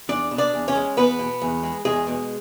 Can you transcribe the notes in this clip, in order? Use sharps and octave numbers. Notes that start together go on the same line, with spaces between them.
E2 D4 D5
B2
D4 D5
E2
C#4 C#5
G#3
E2 B3 B4
B2
E2
G#3
E2 G#3 G#4
B2